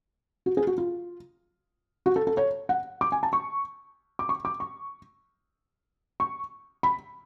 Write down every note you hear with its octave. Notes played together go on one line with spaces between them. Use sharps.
F#4
G#4
F#4
F4
F#4
A4
A4
C#5
F#5
D6
G#5
A5
C#6
D6
C#6
D6
C#6
C#6
B5